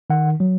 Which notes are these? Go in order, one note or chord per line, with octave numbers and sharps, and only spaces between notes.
D#3 F#5
F#3